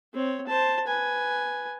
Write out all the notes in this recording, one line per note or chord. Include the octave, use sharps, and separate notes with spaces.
C4 C#5
C5 A5
B4 G#5